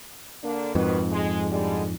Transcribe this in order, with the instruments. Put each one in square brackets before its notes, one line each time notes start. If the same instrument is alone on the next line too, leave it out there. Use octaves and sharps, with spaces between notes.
[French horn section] D3 A#3 D4
[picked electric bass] F2 G#2 [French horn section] D#3 F#4 B4
[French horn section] G#3
D3 G3 G#3